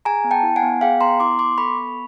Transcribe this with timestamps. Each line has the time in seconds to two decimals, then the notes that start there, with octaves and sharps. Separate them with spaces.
0.05 G#4 G#5 A#5
0.24 B3
0.31 G5 A5
0.43 E4
0.56 F#5 G#5
0.63 B3
0.81 G#4 F5 G5
1.01 B3 A#5 C6
1.20 E4 C6 D6
1.39 B3 C6 D6
1.58 A4 B5 C#6
1.77 B3